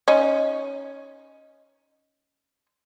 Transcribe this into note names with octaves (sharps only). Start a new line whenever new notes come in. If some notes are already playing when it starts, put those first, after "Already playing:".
C#4 D#4